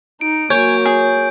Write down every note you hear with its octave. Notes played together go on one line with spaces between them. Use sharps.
D#4 D7
F#3 A#3 C#5 G#5 G6 D7
G#4